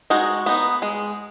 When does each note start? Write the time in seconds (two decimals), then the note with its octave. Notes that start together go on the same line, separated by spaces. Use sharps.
0.10 G#3 D#4 F#4
0.46 B3 D#4
0.82 G#3